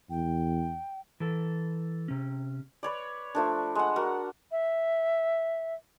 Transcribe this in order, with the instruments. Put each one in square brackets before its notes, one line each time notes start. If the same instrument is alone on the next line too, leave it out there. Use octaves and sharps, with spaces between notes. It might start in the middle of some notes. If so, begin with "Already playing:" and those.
[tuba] E2 [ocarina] G5
[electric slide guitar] E3 A4
C3 C#4
[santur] B4 C#5 D5
F3 A3 D4
G#3 F#5
F#4 A#4
[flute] E5